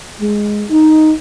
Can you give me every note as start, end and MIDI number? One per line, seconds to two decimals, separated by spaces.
0.20 0.65 56
0.71 1.13 63